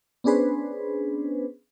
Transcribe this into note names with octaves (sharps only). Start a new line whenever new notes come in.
B3 C#4 D4 G#4 B4 C5